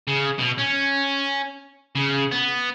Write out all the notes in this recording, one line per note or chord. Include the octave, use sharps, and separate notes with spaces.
C#3
B2
C#4
C#3
B3